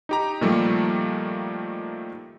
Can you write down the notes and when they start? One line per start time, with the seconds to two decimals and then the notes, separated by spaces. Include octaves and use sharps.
0.09 D#4 G4 A#5
0.41 A#2 D#3 F3 G3 A3 A#3